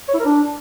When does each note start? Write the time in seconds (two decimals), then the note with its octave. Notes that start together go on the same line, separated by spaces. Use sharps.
0.09 C#5
0.14 E4
0.20 A#4
0.25 D4